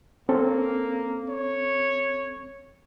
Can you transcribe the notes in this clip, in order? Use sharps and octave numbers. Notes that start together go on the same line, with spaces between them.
A#3 C4 C#4 A4
C#5